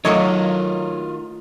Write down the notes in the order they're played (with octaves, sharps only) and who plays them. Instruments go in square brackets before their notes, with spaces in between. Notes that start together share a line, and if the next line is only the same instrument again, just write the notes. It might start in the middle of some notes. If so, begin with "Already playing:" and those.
[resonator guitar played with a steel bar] D#3 D#5 [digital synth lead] F#3 [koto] A3 A#3 C#5 [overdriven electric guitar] F4 F#4